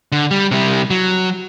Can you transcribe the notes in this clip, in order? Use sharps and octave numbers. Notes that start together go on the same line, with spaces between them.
D3
G3
C3 G3
F#3